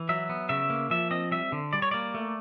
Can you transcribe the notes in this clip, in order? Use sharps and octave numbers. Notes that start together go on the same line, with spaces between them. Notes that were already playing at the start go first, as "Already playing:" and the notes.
Already playing: E3
F#3 E5
B3
C#3 E5
A#3
F3 E5
C4 D#5
G3 E5
D3
G3 D5
C#5
A#3 D5
A3